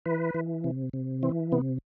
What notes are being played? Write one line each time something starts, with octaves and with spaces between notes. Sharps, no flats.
E3 B4
E3
C3
C3
E3 C4
C3 B3